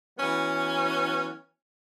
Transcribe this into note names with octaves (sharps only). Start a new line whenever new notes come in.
E3 F#3 B3 C#4